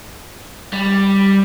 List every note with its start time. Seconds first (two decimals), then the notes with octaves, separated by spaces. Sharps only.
0.73 G3